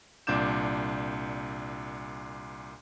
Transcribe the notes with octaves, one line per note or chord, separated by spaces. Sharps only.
C2 A#2 D4 D6 G6 E7